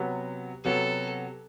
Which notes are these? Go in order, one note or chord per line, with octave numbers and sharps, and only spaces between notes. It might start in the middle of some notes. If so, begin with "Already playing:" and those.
Already playing: C3 F#3 B3 F#4
C3 F#3 B3 F#4 A4